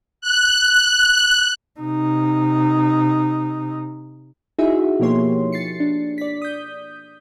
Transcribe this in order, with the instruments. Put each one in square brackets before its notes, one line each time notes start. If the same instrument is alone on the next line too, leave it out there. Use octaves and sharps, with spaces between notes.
[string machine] F#6
[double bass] C3 D#4
[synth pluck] D#4 E4 F#4 G#4 E5
B2 F3 A#3 G4 C#5 C6
A6 C7 C#7
D4
D5 B6
D#6 G6